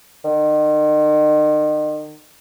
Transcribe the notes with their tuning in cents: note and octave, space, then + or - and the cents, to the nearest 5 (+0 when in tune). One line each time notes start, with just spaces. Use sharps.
D#3 -40